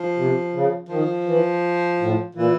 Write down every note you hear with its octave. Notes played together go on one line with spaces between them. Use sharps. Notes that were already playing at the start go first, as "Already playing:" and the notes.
Already playing: F3
C3
C#3
D#3 F3
E3
A2
A#2 E3